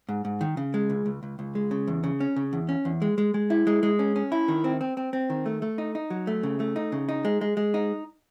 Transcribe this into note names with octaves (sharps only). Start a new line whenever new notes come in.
G#2
G#2
D#3
C#3
G#3
C#2
C#2
C#2
C#2
G#3
C#3
E2
C#3
C#4
C#3
E2
C#4
E2
G#3
G#3
G#3
E4
G#3
G#3
C#4
C#4
E4
D#3
C4
C4
C4
C4
D#3
A3
A3
D#4
D#4
F#3
A3
C#3
A3
D#4
C#3
D#4
G#3
G#3
G#3
D#4